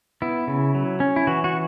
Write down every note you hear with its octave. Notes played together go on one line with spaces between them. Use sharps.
B3 E4
C#3
F#3
C#4
E4
E3 F#4
F#4